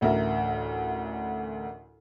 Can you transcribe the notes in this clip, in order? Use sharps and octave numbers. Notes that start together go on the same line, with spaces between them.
A1 D2 A#4 E5